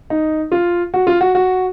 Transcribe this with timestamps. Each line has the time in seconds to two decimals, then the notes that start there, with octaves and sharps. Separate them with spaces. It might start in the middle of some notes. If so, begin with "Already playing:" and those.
0.10 D#4
0.52 F4
0.94 F#4
1.07 F4
1.21 F#4
1.35 F#4